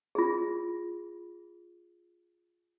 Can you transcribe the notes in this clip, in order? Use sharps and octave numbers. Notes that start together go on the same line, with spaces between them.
F4 G#4